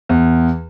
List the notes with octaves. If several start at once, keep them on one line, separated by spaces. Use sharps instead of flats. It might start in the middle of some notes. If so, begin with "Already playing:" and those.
E2